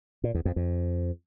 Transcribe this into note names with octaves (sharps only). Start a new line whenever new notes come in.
A#2
E2
F2
F2